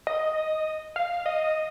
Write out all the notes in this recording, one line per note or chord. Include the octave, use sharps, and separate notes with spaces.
D#5
F5
D#5